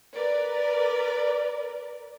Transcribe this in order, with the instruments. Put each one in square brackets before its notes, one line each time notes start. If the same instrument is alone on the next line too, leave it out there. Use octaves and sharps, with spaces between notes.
[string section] A#4 B4 D5